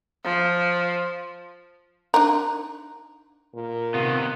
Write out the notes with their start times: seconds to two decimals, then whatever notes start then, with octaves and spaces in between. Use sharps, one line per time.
0.24 F3
2.14 D4 D#4 A#4
3.54 A#2
3.94 C3 D#3 B3 F4